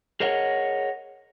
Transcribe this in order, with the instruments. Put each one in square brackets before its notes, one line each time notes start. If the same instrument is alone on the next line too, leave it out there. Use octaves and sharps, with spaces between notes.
[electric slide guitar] G#4 A#4 C#5 D#5 F#5